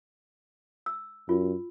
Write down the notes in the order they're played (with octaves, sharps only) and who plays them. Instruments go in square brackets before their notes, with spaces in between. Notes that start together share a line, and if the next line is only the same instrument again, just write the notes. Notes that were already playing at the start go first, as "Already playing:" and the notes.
[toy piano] E6
[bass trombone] F#2 [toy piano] F4